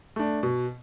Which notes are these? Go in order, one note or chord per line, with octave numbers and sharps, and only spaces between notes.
A3 D4
B2